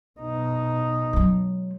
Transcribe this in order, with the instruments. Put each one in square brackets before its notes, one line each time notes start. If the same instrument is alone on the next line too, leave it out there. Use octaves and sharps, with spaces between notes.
[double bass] B2 D#4
[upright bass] F#3 G#3